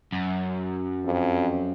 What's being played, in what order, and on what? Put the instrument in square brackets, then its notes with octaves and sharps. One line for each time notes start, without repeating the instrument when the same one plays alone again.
[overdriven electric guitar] F#2
[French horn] F2